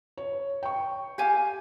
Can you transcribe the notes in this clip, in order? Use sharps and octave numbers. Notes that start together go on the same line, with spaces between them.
C#5
G5 C#6
G4 F5 G#5